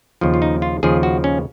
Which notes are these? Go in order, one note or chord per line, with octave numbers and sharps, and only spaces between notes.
D#2 C#3 F3
F4
D#4
F4
D#2 C#3 F3 G#4
F#4
C#4